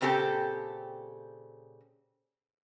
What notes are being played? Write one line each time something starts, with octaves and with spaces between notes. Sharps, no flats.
A#2 C#3 C4 G4 A4